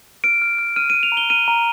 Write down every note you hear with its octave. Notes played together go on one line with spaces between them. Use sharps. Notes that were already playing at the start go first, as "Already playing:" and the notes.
F6 D7
F6
F6
F6 D#7
D#7
F6
F7
A#5
G7
F6 D#7
A#5